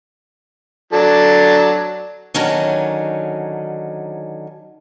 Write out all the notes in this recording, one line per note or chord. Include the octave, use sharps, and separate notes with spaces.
F#3 D4 A4
D3 D#3 F#3 C#4